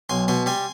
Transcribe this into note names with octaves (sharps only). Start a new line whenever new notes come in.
B1 G#5 C6
B2 G#5 C6
G3 G#5 C6